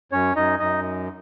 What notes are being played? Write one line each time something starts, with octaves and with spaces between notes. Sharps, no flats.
F#2 C#4 C#5
F#2 D#4 D#5
F#2 D#4 D#5